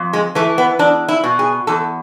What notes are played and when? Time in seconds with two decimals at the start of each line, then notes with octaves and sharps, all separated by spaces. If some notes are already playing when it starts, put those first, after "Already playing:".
Already playing: F2
0.13 G#3
0.35 E3 A3
0.58 B3
0.79 E2 D4
1.08 E4
1.24 B2
1.39 G#4
1.67 E2 A4